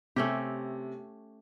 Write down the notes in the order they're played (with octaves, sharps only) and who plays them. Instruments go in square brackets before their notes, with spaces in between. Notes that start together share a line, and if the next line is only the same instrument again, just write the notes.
[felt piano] C3 [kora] A3 C#4 G4